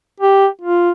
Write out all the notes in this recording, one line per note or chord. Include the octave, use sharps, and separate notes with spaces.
G4
F4